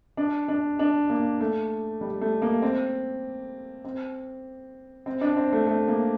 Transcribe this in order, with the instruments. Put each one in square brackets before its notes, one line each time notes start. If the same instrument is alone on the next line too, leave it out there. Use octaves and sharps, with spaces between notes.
[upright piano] D4
D4
D4
A#3
A3
G3
A3
A#3
C4
C4
C4
D4
C4
A3
A3
A#3